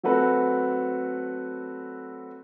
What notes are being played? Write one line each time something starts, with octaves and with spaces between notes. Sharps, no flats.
F#3 A3 C4 F#4 A4 B4